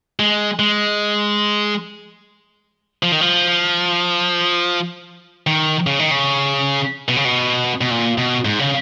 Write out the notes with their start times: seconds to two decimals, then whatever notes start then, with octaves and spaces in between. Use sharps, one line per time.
0.20 G#3
0.59 G#3
3.03 F3
3.12 D#3
3.21 F3
5.47 D#3
5.87 C#3
5.99 D#3
6.11 C#3
7.08 B2
7.16 C#3
7.25 B2
7.81 B2
7.91 A#2
8.18 B2
8.45 G#2
8.59 C#3